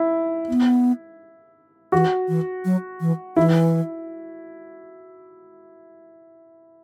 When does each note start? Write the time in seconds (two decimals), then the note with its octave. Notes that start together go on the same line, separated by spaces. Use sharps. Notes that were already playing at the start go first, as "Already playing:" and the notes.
Already playing: E4
0.49 B3
1.92 E3 F#4
2.28 E3
2.65 F#3
3.01 E3
3.36 E3 E4